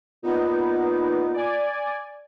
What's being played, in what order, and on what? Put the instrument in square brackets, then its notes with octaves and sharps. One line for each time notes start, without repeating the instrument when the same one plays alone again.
[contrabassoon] A#2 [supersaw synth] B3 D#4
[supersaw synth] D5 G#5